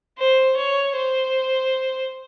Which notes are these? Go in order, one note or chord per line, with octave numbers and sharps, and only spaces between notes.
C5
C#5
C5